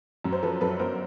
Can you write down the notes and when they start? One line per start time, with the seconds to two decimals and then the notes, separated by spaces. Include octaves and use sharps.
0.24 F#2
0.32 C5
0.43 F3 A4 B4
0.61 F#2 A4 B4
0.79 G1 A#4 C5